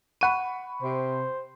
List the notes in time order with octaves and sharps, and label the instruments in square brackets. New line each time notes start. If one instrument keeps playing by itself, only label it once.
[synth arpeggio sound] F#5 D#7 [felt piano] B5 C#6
[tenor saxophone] C3 [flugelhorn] C5